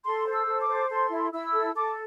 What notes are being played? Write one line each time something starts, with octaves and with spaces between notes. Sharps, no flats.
A4 C6
C5
E6
A4
D6
C5
A4 C6
E4
E4 E6
A4
A4 D6